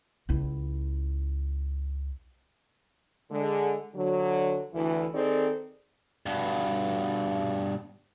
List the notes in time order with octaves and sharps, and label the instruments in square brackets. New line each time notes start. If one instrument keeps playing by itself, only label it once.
[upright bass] C#2 E4
[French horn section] D3 G#3
D3 F#3
D2 E3 E4
D#3 C4 D#4 G#4 A4 D5
[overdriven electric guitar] G2 B2